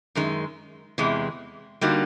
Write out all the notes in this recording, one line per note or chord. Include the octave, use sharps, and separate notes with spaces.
F#2 D#3 G#3
E2 C3 E3 G#3
D3 G3 A#3 D#4 F#4